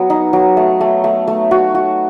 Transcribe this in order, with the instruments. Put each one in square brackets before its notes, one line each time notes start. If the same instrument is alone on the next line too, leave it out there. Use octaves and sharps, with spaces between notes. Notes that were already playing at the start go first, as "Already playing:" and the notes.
Already playing: [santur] F#3 B3
D#4
F#3
A3
A3
A3
A3
F#4
F#4